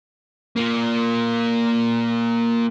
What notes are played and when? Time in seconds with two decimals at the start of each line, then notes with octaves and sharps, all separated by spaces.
0.56 A#3 F4